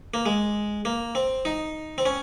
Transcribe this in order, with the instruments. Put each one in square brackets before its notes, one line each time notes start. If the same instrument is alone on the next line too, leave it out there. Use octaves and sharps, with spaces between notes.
[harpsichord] A#3
G#3
A#3
C4
D#4
C4
C#4